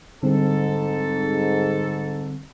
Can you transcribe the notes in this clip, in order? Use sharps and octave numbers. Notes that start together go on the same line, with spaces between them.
G#2 D3 G3 C4 A4